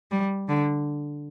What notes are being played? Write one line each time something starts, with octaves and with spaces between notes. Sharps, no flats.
G3
D3